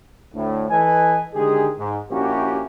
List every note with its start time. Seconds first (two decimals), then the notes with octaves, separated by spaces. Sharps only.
0.34 D2 A2
0.70 E3 A4 B4 D#5 G#5
1.34 D3 D#3 G#3 G4 G#4
1.78 G#2
2.10 A#1 A#3 C#4 E4 F#4 G4